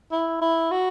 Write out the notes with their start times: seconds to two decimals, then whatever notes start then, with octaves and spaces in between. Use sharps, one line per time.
0.12 E4
0.41 E4
0.71 F#4